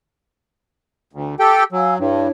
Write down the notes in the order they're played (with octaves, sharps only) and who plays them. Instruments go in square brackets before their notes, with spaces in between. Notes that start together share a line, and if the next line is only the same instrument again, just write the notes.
[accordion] D2
G4 A4 G5
[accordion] F#3 [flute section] F5 G#5 E6
[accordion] G2 [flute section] D4 E4 C#5